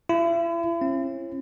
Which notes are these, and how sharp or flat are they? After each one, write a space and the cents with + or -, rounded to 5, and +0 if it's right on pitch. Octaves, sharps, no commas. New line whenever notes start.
E4 +40
C#4 -45